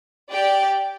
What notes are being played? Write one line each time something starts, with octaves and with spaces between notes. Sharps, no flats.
G4 D5 G5